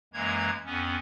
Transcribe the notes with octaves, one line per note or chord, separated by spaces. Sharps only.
F#2 E3 G#3 A#3 A#5 G#6
F2 B3 C#4